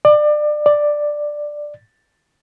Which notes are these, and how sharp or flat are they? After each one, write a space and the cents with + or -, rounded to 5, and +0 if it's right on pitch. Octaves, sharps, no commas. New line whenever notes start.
D5 +30
D5 +10